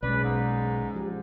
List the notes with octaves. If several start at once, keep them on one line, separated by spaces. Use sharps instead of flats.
B1 G#3 C#4 B4 D5
G#2
F3 G4